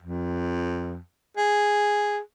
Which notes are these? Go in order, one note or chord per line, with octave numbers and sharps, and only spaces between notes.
F2
G#4